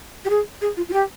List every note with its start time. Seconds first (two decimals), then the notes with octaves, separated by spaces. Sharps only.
0.25 G4
0.30 G#4
0.61 G#4
0.77 F4
0.89 F4
0.93 G4